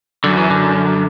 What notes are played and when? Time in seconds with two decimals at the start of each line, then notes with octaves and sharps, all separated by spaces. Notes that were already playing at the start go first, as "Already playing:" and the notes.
0.24 F#2 D3
0.37 E3
0.50 D3